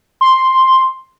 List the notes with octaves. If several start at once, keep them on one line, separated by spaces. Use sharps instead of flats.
C6